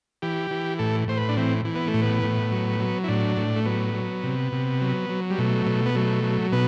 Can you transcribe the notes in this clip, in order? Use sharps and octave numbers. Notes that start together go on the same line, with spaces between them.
E3 G4
E3
A2 A4
A2 C5
B4
D4
E3 C4
E3
B3
A3
A2
B3
A2
F#3
F#3
E4
A2 D4
A2
A3
F#3 B3
F#3
C3
C3
F#3
F#3
G3
B2 A3
B2
B3
F#3 A3
F#3
B2 B3